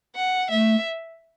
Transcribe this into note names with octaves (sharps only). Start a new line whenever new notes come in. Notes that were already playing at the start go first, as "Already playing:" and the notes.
F#5
A3 E5